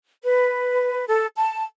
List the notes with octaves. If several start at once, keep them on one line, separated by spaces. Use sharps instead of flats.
B4
A4
A5